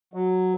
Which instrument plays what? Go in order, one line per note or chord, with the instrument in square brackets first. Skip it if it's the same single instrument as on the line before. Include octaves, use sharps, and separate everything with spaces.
[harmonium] F#3